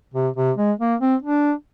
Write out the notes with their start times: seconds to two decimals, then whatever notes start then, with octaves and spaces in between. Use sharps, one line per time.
0.14 C3
0.36 C3
0.57 G#3
0.80 A#3
1.00 C4
1.22 D4